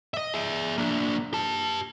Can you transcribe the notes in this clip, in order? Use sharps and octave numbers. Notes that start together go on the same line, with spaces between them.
D#5 E5
G#4 E5
A#3 D4
G4 A5